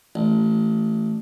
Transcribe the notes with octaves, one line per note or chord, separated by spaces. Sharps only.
A1